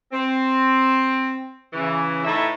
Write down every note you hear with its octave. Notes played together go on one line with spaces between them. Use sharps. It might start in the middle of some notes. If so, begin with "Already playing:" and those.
C4
C#3 E3
A2 D#4 A4 B4 C#5 E5